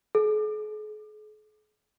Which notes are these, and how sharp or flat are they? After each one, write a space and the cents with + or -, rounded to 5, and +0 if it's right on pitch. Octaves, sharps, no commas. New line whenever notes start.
G#4 +45